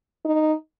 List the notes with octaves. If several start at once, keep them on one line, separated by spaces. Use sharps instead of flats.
D#4